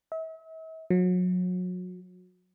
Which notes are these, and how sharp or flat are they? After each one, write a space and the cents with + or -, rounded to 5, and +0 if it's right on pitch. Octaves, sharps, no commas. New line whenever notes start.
E5 -45
F#3 -35